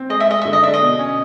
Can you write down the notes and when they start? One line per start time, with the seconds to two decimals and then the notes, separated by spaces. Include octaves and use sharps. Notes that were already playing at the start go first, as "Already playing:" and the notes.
Already playing: C4
0.09 G#3 D#5
0.20 E5
0.28 G#3 D#5
0.42 D3 E5
0.53 D#5
0.63 D4 E5
0.74 D#5
0.81 B2
0.99 C#4